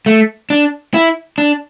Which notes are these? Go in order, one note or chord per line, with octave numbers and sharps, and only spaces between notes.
A3
D4
E4
D4